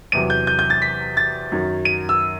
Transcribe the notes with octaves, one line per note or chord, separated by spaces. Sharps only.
E2 C3 F#3 D#7
G6
G6
G6
A6
B6
A6
F#2 D#3 F#3
D#7
E6